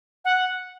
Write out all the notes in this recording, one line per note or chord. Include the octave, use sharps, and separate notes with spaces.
F#5